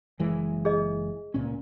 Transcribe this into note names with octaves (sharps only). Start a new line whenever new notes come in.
F#1 E3 G#3
G#4 D#5
C#2 A#2 C#4